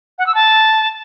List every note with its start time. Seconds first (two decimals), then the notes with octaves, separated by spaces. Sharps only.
0.19 F#5
0.27 E6
0.35 A5